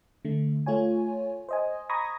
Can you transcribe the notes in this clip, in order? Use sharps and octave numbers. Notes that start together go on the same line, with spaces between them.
D3 A3
A3 F4 C#5 G#5
C5 D#5 G#5
A#5 B5 C#6 D#6 G#6 A#6